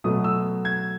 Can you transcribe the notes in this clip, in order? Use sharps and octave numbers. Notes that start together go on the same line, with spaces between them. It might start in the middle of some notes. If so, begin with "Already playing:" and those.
B2 F#3 A3 D#6
E6
G#6